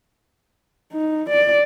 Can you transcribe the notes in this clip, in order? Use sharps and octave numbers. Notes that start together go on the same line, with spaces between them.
D#4
D5